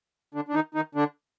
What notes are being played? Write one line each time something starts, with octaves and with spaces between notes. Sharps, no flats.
D3 D4
D4
D#3 D#4
D#3 D#4
D3 D4